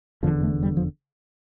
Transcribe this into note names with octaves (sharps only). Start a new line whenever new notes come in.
F1 E2 D3 F3
A3
G3
F3